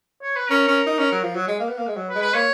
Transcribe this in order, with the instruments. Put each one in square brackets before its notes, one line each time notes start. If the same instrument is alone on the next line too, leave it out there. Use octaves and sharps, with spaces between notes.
[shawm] C#5
B4
[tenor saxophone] C#4 [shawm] A#4
[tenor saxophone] C#4
D#4
C#4
F#3
F3
F#3
G#3
A#3
B3
A#3
G#3
F#3
[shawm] B4
[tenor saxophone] G#3
[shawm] B4
[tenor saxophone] A#3 [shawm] C#5